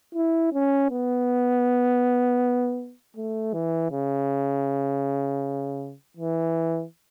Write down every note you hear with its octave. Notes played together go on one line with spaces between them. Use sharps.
E4
C#4
B3
A3
E3
C#3
E3